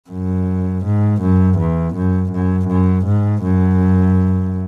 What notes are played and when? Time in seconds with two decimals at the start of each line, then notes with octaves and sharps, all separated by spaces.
0.10 F#2
0.85 G#2
1.21 F#2
1.58 E2
1.95 F#2
2.31 F#2
2.68 F#2
3.05 G#2
3.42 F#2